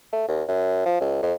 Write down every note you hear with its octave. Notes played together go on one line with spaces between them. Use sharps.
A3
D#2
F#2
F3
C#2
F2